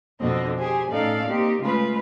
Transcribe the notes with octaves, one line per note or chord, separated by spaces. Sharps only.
F2 B2 D3 C4 D#5
G4 G#4 C5 G#5
A2 C#4 D#4 A4 D5 F5
A#3 C4 D#4 G4
C#3 G#3 A3 F4 B4